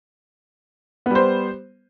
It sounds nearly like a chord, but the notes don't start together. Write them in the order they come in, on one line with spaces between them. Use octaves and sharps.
B3 G3 C5